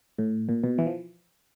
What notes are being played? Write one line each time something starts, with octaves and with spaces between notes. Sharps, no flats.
A2
A#2
B2
E3
F3